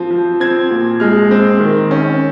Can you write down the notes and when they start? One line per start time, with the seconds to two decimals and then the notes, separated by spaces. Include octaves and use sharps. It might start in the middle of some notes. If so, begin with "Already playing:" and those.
Already playing: F3 C4
0.11 F3
0.40 C4 G#6
0.71 A#2
1.00 G#3 F6
1.31 C4
1.60 D#3
1.91 C#4